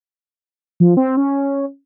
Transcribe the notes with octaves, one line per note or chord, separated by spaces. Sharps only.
F3
C4
C#4